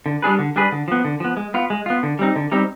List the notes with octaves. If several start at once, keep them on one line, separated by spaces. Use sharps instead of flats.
D3
G3 D4 G#4 B4
D3
G3 D4 G#4 B4
D3
F3 B3
D3
F3 B3
G#3
B3 F4
G#3
B3 F4
D3
G3 C4 D#4
D3
G3 C4 D#4